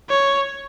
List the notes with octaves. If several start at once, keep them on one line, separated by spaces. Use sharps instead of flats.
C#5